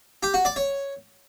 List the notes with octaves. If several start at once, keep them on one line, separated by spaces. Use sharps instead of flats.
G4
F#4
D5
C#5